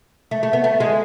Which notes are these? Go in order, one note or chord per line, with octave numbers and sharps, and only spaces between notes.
A3
A3
B3
A3
G#3